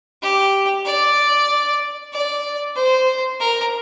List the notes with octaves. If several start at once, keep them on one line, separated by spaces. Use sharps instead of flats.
G4
D5
D5
C5
A#4